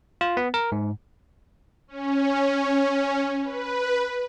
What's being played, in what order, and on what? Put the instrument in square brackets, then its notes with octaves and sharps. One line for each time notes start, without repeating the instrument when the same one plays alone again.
[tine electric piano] F4
B3
A#4
G#2
[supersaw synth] C#4
B4